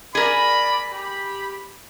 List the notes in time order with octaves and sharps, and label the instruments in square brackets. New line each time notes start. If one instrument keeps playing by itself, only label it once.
[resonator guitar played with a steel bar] G#4 A#4 [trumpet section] D5 B5
[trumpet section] G4 B5